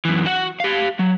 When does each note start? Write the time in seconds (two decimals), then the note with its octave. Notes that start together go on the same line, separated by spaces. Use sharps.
0.05 F#2 E3
0.26 F#4 F#5
0.60 G4 F5
0.99 F#3